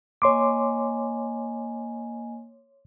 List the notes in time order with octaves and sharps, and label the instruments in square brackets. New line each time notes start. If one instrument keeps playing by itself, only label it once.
[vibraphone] A#3 D#5 G#5 [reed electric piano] C#5 C6 D6